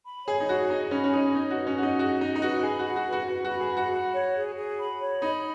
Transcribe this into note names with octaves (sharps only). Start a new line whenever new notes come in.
B5
G#4 C#5
D#4
F#4 G#4
D#4 G#4
C#4 B5
C#4
D#4 C#5
D#4 D#5
F#4
B4
C#4
F#4 F#5
D#4
F#4 G#4
D#4 D#5
D#4
F#4 B4
G#4 B5
F#4
F#5
F#4
B4
F#4
F#4 B4
F#4
B5
G#4
F#5
F#4
B5
C#5
G#4
G#4
B5
C#5
D#4 B5